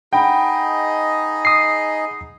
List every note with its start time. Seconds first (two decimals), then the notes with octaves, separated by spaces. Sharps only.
0.13 D#4 G#4 D#5 F#5 G5 B5
1.45 D#6 C7